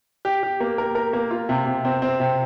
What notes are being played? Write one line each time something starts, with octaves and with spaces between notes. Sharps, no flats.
G4
G4
A#3
A#4
A#4
A#3
F4
C3
C3
C4
C4
C3